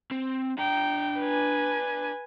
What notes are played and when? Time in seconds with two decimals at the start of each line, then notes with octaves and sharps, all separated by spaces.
0.11 C4
0.58 D4 G5 A#5
1.20 B4 G#5